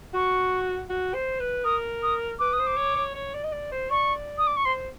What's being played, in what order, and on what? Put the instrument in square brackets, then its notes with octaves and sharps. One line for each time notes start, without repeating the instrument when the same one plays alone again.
[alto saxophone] F#4 [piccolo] C#6
[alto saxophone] F#4
C5
B4
[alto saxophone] A#4 [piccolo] D#6
[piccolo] D#6
[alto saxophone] B4 [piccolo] D6
[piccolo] D#6
[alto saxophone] C5
[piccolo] D6
[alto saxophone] C#5
C#5
C#5
D5
D#5
D5
C5
[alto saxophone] D5 [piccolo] C#6
[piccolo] D#6
D6
C#6
[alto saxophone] C5 [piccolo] C6